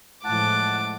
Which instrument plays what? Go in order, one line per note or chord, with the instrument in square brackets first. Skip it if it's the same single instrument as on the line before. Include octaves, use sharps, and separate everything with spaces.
[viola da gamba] A2 F3 G#3 [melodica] F#5 A5 [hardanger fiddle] D6